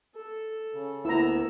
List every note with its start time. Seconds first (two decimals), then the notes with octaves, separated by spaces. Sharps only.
0.15 A4
0.74 C#3
1.05 D2 A#3 B3 E4 A#5 E6